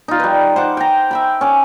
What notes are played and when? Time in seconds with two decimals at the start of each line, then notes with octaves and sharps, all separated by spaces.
0.08 D#4 F4
0.19 G3 B4
0.56 C5 F#5 D6
0.77 G5 A#5
1.11 E5 G5 B5
1.41 C#4 D6